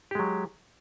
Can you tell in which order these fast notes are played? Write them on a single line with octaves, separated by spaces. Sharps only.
G4 G#3 F#3